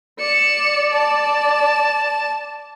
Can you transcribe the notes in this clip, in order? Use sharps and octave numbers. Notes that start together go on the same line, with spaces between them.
D5 C#7 E7
A5